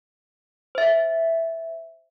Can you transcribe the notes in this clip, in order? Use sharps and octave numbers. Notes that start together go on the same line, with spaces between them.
C5 E5